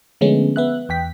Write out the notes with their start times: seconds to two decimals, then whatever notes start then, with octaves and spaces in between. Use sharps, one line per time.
0.21 D3 F3 G#3 A3 B3 C#4
0.56 B3 E5 F#6
0.89 E2 G5 B6